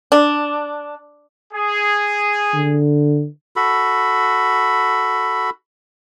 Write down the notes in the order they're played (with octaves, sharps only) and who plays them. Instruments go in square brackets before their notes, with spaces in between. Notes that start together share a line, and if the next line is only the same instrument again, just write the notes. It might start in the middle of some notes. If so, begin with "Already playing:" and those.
[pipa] D4
[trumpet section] G#4
[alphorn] D3
[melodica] F#4 A4 B5